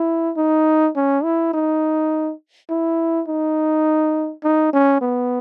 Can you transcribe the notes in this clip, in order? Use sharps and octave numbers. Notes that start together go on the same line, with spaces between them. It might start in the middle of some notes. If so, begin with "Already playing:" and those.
Already playing: E4
D#4
C#4
E4
D#4
E4
D#4
D#4
C#4
B3